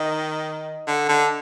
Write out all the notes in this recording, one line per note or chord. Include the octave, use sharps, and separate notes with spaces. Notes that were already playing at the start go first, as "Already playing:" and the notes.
Already playing: D#3 D#5
D3
D3